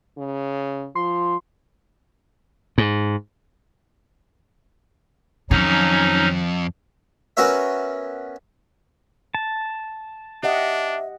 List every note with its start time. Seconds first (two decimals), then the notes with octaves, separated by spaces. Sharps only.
0.18 C#3
0.95 F3 C6
2.78 G#2
5.51 F2 D#3 F#3 C#4 D#4
7.37 B3 C#4 F#4 A#4 C#5 E5
9.35 A5
10.43 D4 G4 D#5 E5 F#5